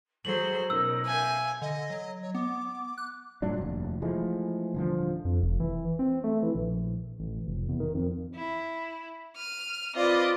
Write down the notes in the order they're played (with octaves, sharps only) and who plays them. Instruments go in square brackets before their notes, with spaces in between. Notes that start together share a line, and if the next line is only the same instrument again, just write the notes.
[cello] F#3 C5 [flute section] G#4 A4 G6 [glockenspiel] F#7
[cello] B2 [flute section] C#4 D#4 A#4 [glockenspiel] E6
[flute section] E5 F5 G6 [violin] G#5
[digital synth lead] D3 [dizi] D#5
[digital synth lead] F#3
[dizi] C#5
[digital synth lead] B3 [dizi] D6
[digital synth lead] F#6
[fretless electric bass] G2 A#2 F#3 D4
F1 D#2
E3 F3 G#3 A3
D#1 D3 F3
[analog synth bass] F2
F1
E3
C4
A3
E3
A#1
A1
F1
E2
D#3
F2
[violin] E4
F6 D#7
[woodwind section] C4 D5 [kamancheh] F4 [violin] B4 D#5